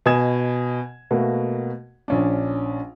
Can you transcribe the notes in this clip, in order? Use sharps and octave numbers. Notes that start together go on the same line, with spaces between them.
B2 D#5 G#5 D#6 G#6 E7
B2 A3 A#3 F#4
A#1 C#4 D4